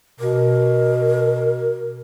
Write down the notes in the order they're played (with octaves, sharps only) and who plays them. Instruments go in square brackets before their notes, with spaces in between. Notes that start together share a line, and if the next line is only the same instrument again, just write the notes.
[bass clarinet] B2 [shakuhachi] A#4